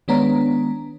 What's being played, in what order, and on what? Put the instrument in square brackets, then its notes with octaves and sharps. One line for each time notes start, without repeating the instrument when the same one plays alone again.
[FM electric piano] D#3 G#3 B3 D4 C#5 A#5